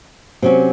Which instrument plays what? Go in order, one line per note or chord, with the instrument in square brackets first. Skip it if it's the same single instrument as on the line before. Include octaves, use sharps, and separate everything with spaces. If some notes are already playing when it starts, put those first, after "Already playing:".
[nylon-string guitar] C3 F#3 C#4